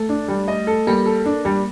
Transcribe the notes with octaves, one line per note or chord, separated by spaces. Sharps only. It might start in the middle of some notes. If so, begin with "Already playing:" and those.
Already playing: A3 A4
D4
G3
D#5
A4
G3 A#3
A4
D4
G3